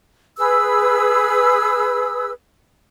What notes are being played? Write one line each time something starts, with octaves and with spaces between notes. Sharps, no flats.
G#4 B4 E6